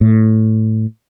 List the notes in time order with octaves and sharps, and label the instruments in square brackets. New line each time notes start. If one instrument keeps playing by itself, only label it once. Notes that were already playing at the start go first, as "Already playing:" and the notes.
[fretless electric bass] A2